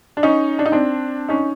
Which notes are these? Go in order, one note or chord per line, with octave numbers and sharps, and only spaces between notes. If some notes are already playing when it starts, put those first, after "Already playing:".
D4
C#4 D#4
D4
D#4
C4 D4
C#4 D#4